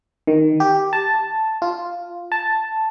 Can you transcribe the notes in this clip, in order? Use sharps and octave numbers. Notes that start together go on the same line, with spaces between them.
D#3
G4
A5
F4
A5